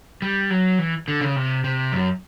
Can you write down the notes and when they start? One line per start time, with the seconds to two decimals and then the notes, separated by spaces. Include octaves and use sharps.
0.22 G3
0.50 F#3
0.79 E3
1.08 D3
1.21 C#3
1.36 C3
1.64 C3
1.92 F#2